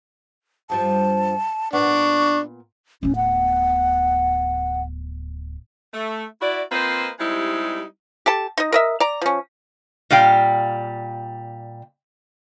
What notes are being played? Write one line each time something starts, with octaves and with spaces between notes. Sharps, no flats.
G2 F3 G3 A5
A#2 B3 D4 C#6
D1 B3 C#4
F#5
A3
E4 F#4 D5
A#3 C4 F4 B4 C5 D#5
G3 G#3 C4 D#4 E4 G4
G4 A4 A5
D#4 D#5
A#4 D#5 E5
D5 A#5
F3 C#4
A#2 G3 F5 G5